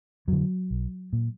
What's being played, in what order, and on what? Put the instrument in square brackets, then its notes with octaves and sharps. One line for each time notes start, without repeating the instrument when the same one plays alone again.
[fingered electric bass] F2 D3 F#3
B1
A#2